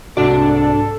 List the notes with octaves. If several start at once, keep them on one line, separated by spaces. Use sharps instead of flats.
C2 G#2 C3 D4 F#4 A4 D5